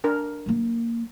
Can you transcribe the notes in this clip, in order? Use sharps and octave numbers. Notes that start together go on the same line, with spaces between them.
D4 A#4
F#3 A#3